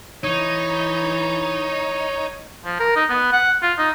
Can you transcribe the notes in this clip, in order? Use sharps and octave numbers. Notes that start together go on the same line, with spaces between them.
E3 D#4 C#5
F3
A#4
D#4
B3
F#5
F4
D#4